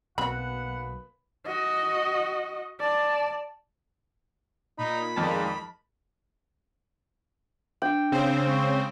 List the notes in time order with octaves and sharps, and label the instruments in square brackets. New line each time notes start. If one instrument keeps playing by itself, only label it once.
[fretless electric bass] B1 [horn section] B2 A#3 B4 [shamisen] C4 F#4 B5 [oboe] F#5
[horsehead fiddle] F#4 D#5
D5 A5
[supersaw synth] A#2 [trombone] D#4 [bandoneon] B5
[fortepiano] F2 A5 [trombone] A#2 [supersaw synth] D#3 G#3
[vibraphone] D4 [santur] G5
[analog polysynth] C#3 C4 C5
[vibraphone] G#3 C#6